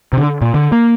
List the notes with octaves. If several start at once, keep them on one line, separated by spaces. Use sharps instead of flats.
C3
D3
A#2
D3
A#3